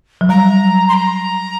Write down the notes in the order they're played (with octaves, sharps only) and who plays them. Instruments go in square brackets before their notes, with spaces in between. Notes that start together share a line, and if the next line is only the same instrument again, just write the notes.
[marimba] F#3
[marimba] G3 [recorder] A#5
[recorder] C6
A#5